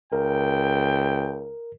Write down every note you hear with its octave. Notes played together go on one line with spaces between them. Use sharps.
C#2 A#4 G5